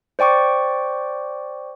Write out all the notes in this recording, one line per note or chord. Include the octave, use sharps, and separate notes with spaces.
C5 D5 G5 C#6 D6